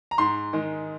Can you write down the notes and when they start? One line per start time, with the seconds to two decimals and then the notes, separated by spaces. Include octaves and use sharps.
0.11 A#5
0.18 G#2 C6
0.53 D#3 G#3